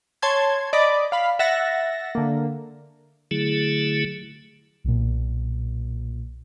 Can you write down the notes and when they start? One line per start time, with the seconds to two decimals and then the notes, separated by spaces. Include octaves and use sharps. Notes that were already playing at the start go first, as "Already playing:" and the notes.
0.22 C#5 A5 C6 G#6
0.73 D5 D#5 B5 D6
1.12 F5 B5
1.39 E5 F#5 A6 A#6
2.15 D3 A#3
3.31 D3 F#3 A3 E4 G#4
4.84 B1 A#2